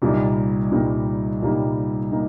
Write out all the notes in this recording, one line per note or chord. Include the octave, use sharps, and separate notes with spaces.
C2 A#2 G3 A#3 D#4
C2 A#2 G3 A#3 D#4
C2 A#2 G3 A#3 D#4
A#3 D#4